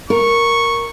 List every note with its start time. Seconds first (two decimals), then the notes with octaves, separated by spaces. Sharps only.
0.10 A#4 C#6